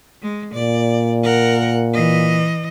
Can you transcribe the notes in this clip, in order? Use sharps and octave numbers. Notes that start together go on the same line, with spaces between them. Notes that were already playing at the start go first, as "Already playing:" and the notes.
G#3
A#2 D5
A#4 F#5
E3 D#5